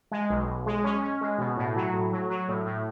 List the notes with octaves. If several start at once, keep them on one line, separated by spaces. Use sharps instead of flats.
G#3
B1
B1
G#3
C#4
C#4
G#3
B2
A2
F#3
A2
F#3
F#3
A2
A2